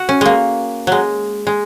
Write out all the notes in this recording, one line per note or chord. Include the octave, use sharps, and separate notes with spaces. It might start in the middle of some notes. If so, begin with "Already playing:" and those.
Already playing: F#4
C#4
G#3 A#3
F#3 G#3
G#3